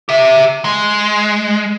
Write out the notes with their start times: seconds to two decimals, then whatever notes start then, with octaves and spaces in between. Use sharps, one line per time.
0.09 G4 E5
0.65 G#3